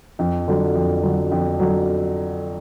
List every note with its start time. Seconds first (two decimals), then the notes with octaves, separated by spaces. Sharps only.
0.19 F2
0.48 D3 F#3
0.75 F2
1.03 D3 F#3
1.31 F2
1.60 D3 F#3